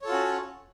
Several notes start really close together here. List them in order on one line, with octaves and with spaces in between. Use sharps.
C#5 A4 F4 F#4 C#4